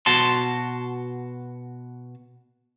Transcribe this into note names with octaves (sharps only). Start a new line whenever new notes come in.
B2 F#4 A5 C6